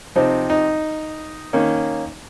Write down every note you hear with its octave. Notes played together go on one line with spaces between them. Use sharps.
C3 F3 C4 D#4
D#4
D#3 A#3 C#4